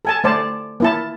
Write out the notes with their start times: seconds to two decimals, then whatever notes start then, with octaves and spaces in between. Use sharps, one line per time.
0.05 A4 G#5 A5
0.24 A3 C5 D5 A5
0.80 A#3 E4 A5